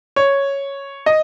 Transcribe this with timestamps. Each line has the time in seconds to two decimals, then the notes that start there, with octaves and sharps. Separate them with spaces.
0.16 C#5
1.06 D#5